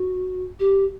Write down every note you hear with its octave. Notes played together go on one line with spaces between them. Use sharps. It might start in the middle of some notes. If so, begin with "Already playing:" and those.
Already playing: F#4
G4